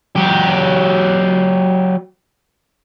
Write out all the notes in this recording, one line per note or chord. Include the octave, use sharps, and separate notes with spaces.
F#3 G4